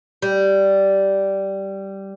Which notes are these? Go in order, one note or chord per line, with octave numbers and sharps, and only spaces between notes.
G3